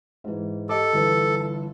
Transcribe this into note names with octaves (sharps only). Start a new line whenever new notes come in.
G#2 E3
G4 A4 D#5 D6
G1 E3 B4